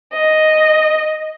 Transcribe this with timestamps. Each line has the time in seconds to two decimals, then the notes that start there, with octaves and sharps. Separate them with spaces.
0.13 D#5